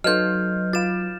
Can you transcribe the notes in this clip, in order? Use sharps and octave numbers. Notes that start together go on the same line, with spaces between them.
F#3 D#4 B4 D#5 F6 G6
F4 F5 A6 E7